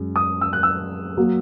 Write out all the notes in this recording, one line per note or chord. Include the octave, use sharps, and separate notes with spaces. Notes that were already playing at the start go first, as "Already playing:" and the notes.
Already playing: F#2 G#3
D#6
E6
F#6
E6
F#3 A#3